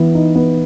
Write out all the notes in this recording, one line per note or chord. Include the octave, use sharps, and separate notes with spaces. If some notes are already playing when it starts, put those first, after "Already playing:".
Already playing: E3 B3
D#4
B3